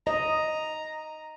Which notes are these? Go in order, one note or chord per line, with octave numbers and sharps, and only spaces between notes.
D#5 A#5